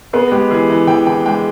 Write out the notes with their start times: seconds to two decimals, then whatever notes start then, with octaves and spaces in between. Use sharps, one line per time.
0.13 B3 G#4
0.32 G#3 G4
0.51 E3 G#4
0.69 E3
0.87 E3 G5
1.07 E3 G5
1.25 G#3 G5